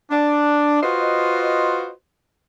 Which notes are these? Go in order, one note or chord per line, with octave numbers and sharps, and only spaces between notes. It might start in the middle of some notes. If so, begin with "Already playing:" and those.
D4
F4 F#4 B4 C5 D#5